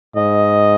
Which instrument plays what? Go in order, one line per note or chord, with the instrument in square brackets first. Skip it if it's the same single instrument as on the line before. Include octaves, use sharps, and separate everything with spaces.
[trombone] G#2 [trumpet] D#5